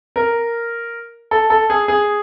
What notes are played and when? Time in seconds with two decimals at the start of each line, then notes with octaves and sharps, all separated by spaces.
0.16 A#4
1.31 A4
1.50 A4
1.70 G#4
1.88 G#4